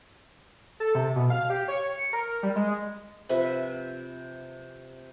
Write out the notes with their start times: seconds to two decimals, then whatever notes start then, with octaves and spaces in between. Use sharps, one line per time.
0.80 A4
0.95 C3
1.15 B2
1.30 F5
1.50 G4
1.68 C#5
1.95 C#7
2.13 A#4
2.43 G3
2.56 G#3
3.29 C3 F3 B4 E5